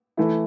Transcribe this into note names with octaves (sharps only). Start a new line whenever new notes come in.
E3 A3 E4